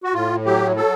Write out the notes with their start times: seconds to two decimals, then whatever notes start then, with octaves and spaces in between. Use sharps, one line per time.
0.04 F#4
0.14 A2 F4
0.45 F#3 G4
0.76 F#3 A4